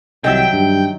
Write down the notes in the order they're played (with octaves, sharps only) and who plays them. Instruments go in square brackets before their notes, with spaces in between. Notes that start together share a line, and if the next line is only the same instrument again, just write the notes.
[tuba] C2 [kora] D#3 F#3 E5 [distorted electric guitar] G5
[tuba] G2